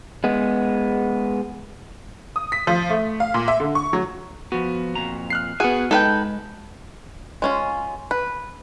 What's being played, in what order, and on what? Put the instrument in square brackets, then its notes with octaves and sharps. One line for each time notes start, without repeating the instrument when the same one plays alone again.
[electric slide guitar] G#3 B3
[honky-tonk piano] D#6
B6
F3
A3
F5
A#2
E5
D3
C#6
F#3
[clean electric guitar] F3 B3 [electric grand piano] F#4
[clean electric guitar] F2 A#2 A#5
[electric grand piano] F6 F#6 C7
[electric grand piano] B3 G#4 [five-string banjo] F#4 [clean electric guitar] F#5 G#5
[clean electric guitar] G#3 [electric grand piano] D#4 [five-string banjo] A4 B4 G5
[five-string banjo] G#3 C#4 F4
B4